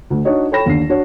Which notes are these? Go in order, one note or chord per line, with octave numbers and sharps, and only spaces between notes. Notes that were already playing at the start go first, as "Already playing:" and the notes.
D2
D4 D#4 F#4 C#5 D#5
A4 C#5 G5 B5 A#6 E7
D#2 D3 C7
D4 F#4 C#5